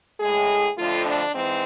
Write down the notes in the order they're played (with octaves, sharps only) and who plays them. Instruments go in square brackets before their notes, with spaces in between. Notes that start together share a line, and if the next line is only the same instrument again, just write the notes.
[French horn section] A2 G#3 G#4
F2 D3 F3 A3 F4
D4
G#2 E3 C4